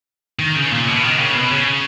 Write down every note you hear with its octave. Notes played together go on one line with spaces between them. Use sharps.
D#3
C#3
A#2
B2
D#3
C#3
B2
C#3